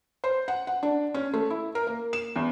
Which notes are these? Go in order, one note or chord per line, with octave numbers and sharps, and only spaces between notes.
C5
F#5
F#5
D4
C#4
A3
E4
A#4
A#3
E7
E2